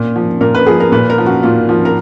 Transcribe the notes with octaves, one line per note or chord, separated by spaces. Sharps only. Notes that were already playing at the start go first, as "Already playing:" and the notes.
Already playing: A#2
F3
A#2 A#4
B4
F3 G#4
A#4
A#2 B4
A#4
F3
F#4
A#2 F4
F3
A#4